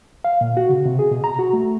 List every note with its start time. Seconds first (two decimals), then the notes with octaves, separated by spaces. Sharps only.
0.24 F5
0.41 A#2
0.57 F#4
0.70 C#3
0.85 C3
0.99 G#4
1.11 B2
1.24 A#5
1.39 F#4
1.53 A3